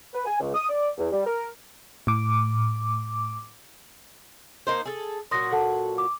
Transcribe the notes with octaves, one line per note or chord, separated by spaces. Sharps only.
B4
G#5
C#2
D#6
D5
E2
G3
A#4
A2 D6
A#3 D#4 C5
G#4 A4
A#2 F#3 F#4 C6 D#6 A#6
A4 F#5 A5
D6